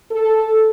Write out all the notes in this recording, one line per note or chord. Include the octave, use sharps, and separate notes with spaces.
A4